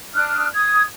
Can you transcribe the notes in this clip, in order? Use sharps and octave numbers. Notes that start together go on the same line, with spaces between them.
D4 D#6 F6 F#6
D#6 G#6